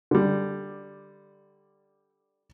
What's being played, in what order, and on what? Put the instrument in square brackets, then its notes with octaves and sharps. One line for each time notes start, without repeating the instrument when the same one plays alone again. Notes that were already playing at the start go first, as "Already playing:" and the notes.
[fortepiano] D3 G3